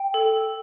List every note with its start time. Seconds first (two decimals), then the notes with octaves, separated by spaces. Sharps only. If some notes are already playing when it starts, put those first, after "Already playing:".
Already playing: G5
0.14 A4